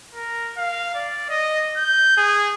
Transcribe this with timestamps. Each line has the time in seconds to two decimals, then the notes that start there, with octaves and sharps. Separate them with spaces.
0.15 A#4
0.58 F5
0.95 D5
1.30 D#5
1.77 G6
2.17 G#4